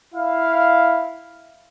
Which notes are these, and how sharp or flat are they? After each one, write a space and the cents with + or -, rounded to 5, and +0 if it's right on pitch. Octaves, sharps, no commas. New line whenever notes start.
E4 +0 F5 +0